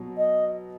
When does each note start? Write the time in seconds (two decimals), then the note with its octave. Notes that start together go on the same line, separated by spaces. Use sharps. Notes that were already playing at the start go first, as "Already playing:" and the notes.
Already playing: B2 F#3
0.17 D#5